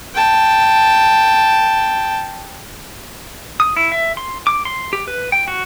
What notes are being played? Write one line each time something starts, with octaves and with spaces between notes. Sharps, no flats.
G5 A5
D#6
E4
E5
C6
D6
C6
G4
B4
G5
F#4